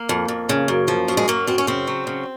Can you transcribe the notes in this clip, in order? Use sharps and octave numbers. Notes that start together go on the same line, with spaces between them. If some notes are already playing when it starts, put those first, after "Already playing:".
Already playing: A#3
F2
F2
C#3
F#2
F3
F#2
G#3
F#3 A#3
F#2 C4
C#4
C#3 C4
F#3
C#3